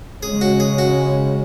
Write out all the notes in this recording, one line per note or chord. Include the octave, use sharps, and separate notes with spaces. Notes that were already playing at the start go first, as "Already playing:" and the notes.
C#3 G#3 C#4 G#4
F#4
G#4
F#4